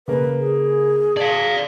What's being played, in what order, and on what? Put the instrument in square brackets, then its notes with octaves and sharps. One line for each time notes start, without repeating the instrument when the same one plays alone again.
[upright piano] C#3 A#3 [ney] B4
[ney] G#4
[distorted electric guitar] D5 F5 [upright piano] A5 G#6